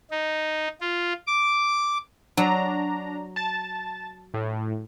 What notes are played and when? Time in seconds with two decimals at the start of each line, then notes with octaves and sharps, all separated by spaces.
0.11 D#4
0.81 F4
1.27 D6
2.37 F#3 D4 A#5
3.36 A5 A6
4.34 A2